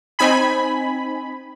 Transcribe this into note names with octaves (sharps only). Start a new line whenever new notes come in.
C4 D#4 G#5 B5